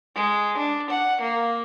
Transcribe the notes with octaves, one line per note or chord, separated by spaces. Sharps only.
G#3
D4
F#5
A#3